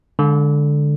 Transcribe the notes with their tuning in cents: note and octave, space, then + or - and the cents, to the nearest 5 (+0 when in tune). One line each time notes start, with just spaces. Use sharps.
D3 +0 G#3 +0